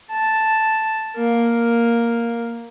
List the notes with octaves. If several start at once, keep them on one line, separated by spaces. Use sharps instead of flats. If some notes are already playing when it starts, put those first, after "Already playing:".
A5
A#3